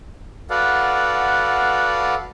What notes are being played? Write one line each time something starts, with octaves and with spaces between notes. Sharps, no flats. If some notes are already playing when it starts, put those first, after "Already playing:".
F#4 A4 B4 D5 F5 F#5